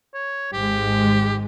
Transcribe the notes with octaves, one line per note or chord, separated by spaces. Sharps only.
C#5
G#1 G#2 G#3 G4